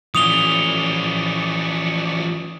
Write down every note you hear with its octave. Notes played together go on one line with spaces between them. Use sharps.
E3 F3 C#4 D5 C#6 D#6 F7 G7